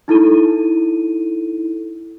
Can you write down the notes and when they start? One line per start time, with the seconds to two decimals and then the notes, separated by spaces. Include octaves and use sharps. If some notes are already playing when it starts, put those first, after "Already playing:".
0.08 D#4 E4 A4 D#7